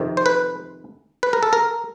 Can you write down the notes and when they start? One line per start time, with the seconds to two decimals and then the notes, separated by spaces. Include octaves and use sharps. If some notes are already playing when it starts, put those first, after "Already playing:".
Already playing: F2 C3 D#3
0.17 C5
0.26 B4
1.23 B4
1.33 A#4
1.43 A4
1.53 A#4